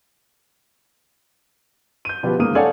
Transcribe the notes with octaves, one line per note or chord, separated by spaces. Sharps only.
G6 D#7
B2 F3 G4 B4
G#1 C#3 A#3 D#6 D#7
A4 C#5 D5 F5 F#5 G#5